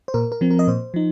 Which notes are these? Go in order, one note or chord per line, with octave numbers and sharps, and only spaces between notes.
C5
A#2 A#4
A#4
F3 C4
A#4
D#5
A#2 C5
F3 D#4